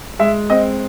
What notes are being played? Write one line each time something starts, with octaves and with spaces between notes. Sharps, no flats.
G#3 E5
C4 D#5